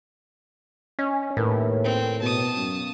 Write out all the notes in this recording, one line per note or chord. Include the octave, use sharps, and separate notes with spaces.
C#4 D#5
D#2 A2 A#4 B4
C4
B2 A5 D#6
F#2 B3